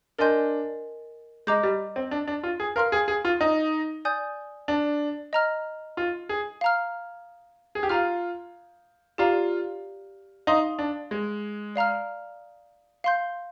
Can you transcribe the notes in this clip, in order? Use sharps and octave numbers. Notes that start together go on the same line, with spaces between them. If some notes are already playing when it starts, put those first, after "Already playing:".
D4 A#4 D#5 G#5 C6 G6
G#3 D#5 A#5 D6 G6
G3
C4
D4
D4
F4
G#4
A#4 F5 C6 F6
G#4
G#4
F4
D#4
D5 G#5 D#6 G6
D4
D#5 A#5 F6
F4
G#4
F5 A#5 F6
G#4
G4
F4 F5 A#5 F6
F4 G4 D5 F5 A#5
D#4 F5 C6 D#6
D4
G#3
D5 F5 A#5 F6
F5 C6 G6